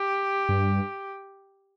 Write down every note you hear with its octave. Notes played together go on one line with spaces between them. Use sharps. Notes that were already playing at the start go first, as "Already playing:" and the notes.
Already playing: G4
G2